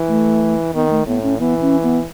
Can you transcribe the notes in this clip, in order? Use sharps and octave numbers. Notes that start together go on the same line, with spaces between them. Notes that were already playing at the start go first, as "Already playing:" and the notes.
Already playing: E3
A3
D#3 B3
A3
A2 B3
C#4
E3 B3
C#4
B3